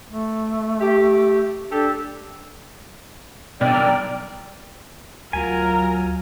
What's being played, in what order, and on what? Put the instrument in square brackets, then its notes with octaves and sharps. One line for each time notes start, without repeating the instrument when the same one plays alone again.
[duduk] A3
[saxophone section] G4
[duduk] D4 [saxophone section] G4 A4
[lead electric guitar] G2 D3 [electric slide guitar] B2 [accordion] D5 [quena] G5
[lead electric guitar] B1 G2 [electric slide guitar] A#4
[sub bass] D2 [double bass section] F#3 [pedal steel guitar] F4 G#5 [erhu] A#4